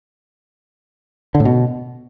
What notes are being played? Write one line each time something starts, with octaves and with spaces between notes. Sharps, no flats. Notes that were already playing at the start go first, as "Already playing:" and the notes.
D3
A2
B2